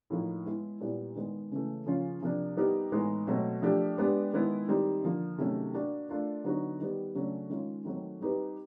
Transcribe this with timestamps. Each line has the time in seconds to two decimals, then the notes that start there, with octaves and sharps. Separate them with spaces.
0.10 A2 F3 A#3 D#4
0.46 G#3 B3 E4
0.80 A#2 G3 B3 E4
1.16 D#3 G#3 B3
1.51 C#3 E3 A3
1.86 C#3 F3 A#3 C#4 F4
2.22 C3 F3 A#3 D4
2.57 G3 B3 D#4 G4 A#4
2.92 A2 E3 G#3 B3 D#4
3.27 B2 F#3 A3 C4
3.62 F3 A3 D4 G4 A#4
3.97 G#3 B3 D4 G4 B4
4.33 D#3 G#3 B3 E4
4.68 D#3 G3 C4 D#4
5.03 D3 F3 A#3
5.38 C3 D#3 F#3 A3 C#4
5.74 A#3 D4 F#4 A#4
6.09 A3 D4 F4 A#4
6.44 D3 F#3 B3 D#4 F#4
6.79 D#3 G3 B3
7.15 C#3 F#3 A3 D4
7.50 D#3 G#3 C#4 F4
7.85 D#3 F#3 A3 C4
8.20 G3 C4 D#4 G4 B4